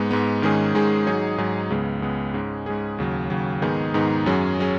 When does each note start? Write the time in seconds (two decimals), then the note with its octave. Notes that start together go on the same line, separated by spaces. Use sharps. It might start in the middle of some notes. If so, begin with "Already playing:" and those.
Already playing: G#2 G#3 B3
0.11 G#2 G#3 B3
0.42 G#2 D#3 G#3 C#4 G#4
0.74 G#2 D#3 G#3 C#4 G#4
1.07 G#2 F#3 D#4 G#4 C#5
1.38 G#2 F#3 D#4 G#4 C#5
1.70 C#2 C#3 G#3 B3
2.02 C#2 C#3 G#3 B3
2.34 G#2 G#3 C#4 G#4
2.66 G#2 G#3 C#4 G#4
2.98 D#2 C#3 F#3
3.30 D#2 C#3 F#3
3.62 G#2 D#3 B3 D#4 G#4
3.94 G#2 D#3 B3 D#4 G#4
4.26 F#2 F#3 C#4 G#4
4.59 F#3 C#4 G#4